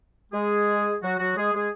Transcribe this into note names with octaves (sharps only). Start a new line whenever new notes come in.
G#3 G#4
F#3 F#4
F#3 F#4
G#3 G#4
G#3 G#4